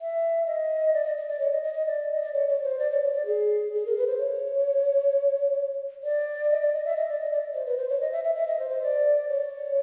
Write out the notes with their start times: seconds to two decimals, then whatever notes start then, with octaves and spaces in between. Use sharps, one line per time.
0.01 E5
0.47 D#5
0.93 D5
1.05 D#5
1.17 D#5
1.28 D5
1.39 C#5
1.52 D#5
1.63 D#5
1.74 D#5
1.86 D5
2.12 D#5
2.22 D5
2.33 C#5
2.48 C#5
2.64 C5
2.78 D5
2.91 C#5
3.02 C#5
3.13 D5
3.26 G#4
3.72 G#4
3.86 A#4
3.97 B4
4.07 C5
4.18 C#5
6.03 D5
6.50 D#5
6.62 D5
6.73 D#5
6.85 E5
6.97 D#5
7.09 D5
7.20 D#5
7.32 D5
7.54 C5
7.66 B4
7.77 C5
7.89 C#5
8.01 D#5
8.12 E5
8.24 E5
8.36 E5
8.47 D#5
8.59 C5
8.70 C5
8.83 D5
9.29 C#5